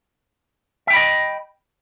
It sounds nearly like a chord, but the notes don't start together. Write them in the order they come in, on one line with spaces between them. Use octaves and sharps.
E5 G5 B5 D#5